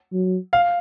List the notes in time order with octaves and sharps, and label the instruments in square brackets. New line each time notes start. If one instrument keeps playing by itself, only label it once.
[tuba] F#3
[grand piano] F5